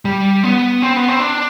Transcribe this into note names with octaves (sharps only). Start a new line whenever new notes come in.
G3
B3
C4
B3
C4
D4